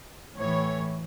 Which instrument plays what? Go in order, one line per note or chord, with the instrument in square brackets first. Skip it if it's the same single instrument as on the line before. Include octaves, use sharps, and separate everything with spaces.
[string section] A2 E3 C#5